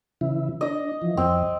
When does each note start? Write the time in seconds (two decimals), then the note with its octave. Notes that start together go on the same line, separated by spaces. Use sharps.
0.21 C#3 E3 E4
0.61 D4 D#5
1.02 E3 F3
1.17 F2 C4